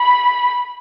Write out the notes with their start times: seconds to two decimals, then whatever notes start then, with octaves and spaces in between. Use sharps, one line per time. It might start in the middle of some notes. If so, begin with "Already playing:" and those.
Already playing: B5